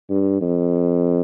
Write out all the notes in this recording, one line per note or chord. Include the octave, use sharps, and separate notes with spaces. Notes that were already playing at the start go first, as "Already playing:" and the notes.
G2
F2